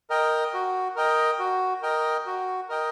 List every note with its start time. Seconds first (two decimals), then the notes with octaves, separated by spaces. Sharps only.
0.10 A#4 D#5 G5
0.54 F#4
0.96 A#4 D#5 G5
1.39 F#4
1.82 A#4 D#5 G5
2.26 F#4
2.69 A#4 D#5 G5